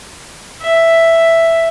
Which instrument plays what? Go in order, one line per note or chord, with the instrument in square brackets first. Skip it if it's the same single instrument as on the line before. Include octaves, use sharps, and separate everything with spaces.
[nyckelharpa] E5